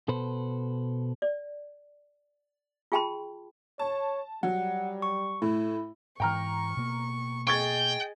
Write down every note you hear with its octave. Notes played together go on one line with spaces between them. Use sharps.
B2 A4 B4 C5
D5
F4 G#4 G5 A5 B5 C6
C#5 A5
F#3 G3 F#5
C#6
A2 E4
G#2 E3 G5 A#5 C#6 F6
B2 A#3
G#4 D#5 G5 C#6 G#6 A6